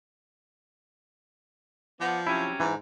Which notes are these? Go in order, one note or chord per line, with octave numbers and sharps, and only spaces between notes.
F3 B3 D5 F#5
C3 F#3 C#4 E4
G#2 E3